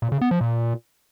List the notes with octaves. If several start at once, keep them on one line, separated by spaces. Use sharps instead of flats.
A#2
C#3
B3
F3
A#2